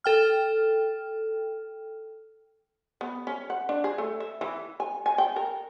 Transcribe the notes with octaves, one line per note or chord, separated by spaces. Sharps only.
A4 G5 F6
B3
C#4
F#5
D4
G#4
A3
E5
E3
G#5
G#5
G5
A#4